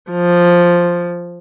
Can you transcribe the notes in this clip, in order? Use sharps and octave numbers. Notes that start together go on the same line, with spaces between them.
F3